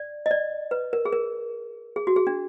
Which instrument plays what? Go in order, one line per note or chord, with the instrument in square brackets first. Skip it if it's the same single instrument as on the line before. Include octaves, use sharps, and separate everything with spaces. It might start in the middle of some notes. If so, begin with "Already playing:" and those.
Already playing: [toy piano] D5
D#5
D5
B4
A#4
G#4
A#4
G#4
F#4
G#4
D4